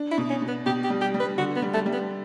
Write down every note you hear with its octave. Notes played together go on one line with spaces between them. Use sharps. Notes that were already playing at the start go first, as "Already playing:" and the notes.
Already playing: D4
E4
B2
C#4
B2
B3
B2 G4
G4
G3
G4
G3
B4
D3 F#4
B3
G3
A3
G3
B3